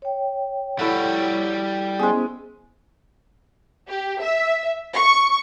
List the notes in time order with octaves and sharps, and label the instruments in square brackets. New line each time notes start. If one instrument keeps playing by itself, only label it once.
[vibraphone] C#5 G5
[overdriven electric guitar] G3 F#4 [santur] E4 A4 F#5
[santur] G#3 G#4 [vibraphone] B3 C#4 C5
[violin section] G4
E5
C#6